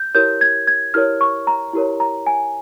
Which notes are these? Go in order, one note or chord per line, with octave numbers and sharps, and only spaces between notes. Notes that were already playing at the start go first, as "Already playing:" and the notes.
Already playing: G6
E4 G4 A#4 C#5 G6
G#6
G#6
E4 G4 A#4 C#5 F6
C#6
A#5
E4 G4 A#4 C#5
A#5
G#5